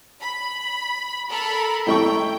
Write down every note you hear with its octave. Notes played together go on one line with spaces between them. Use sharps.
B5
A4 A#4 B5
A2 A3 G5 C#6